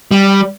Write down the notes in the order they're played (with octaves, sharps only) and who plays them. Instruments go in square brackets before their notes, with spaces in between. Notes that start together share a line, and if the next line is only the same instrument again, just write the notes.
[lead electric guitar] G3